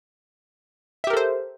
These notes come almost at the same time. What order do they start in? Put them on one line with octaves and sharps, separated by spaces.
E5 G4 A#4 A4 C5